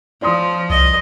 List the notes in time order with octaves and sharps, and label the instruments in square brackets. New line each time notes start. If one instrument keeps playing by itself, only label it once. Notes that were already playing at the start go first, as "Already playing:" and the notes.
[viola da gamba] F3 [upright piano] D5 C6 D#6
[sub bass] C2 [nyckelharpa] D#5